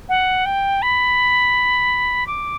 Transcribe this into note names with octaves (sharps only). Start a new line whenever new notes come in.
F#5
G5
B5
D6